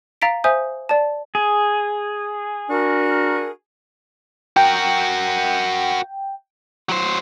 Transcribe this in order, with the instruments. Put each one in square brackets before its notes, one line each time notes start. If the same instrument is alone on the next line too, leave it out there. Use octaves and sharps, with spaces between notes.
[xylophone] F5 A#5 A6 B6 D7
C5 E5 G#5 D#6 G6
D5 A5
[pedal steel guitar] G#4
[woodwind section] D4 F#4 A#4
[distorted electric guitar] F#4 A#4 [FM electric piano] G5
[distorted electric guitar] F#3 C5